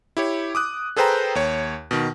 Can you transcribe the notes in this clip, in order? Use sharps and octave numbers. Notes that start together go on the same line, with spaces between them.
E4 G4 C#5
D6 D#6 F#6
G#4 A4 B4 C5 G5 A#5
D#2 C#5
B2 D#3